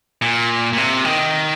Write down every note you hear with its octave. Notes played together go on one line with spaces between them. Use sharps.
A#2
A#2
C3
D#3